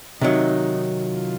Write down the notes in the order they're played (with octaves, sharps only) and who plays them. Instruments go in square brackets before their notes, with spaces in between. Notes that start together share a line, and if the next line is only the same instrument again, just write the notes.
[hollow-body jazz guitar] C3 D#3 F#3 [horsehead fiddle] D#4
[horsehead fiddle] F4